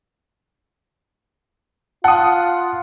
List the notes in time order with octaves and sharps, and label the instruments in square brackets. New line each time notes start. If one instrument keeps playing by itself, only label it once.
[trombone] F4 [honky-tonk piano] F#5 [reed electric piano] A5 D#6